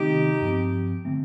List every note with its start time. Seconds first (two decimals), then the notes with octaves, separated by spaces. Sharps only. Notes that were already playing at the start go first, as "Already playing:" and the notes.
Already playing: C3 D#3 A3 C4 D#4 G4
0.41 G2 F3 C4
1.05 D3 A3 C4